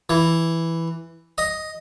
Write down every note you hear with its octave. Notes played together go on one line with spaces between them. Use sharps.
E3
D#5